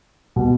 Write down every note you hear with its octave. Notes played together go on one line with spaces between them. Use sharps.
B2